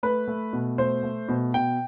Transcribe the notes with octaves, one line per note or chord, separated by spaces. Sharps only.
A3 B4
A3
B2
A3 C5
A3
B2
B2 G5